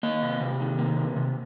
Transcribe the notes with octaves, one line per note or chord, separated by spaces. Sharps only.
A#3 D#5
C3
C3
D#3
A#3
C3
C3